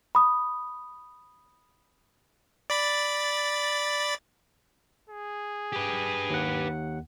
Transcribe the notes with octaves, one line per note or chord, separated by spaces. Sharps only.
B5 D#6
D5 B5 A6
G#4
G4 B4
D#2 F#5